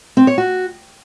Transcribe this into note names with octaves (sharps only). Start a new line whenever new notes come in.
C4
C#5
F#4